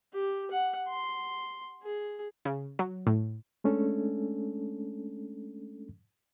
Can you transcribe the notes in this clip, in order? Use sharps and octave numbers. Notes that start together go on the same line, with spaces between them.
G4
F#5
C6
G#4
C#3
F#3
A2
G#3 A3 C#4 D4 A4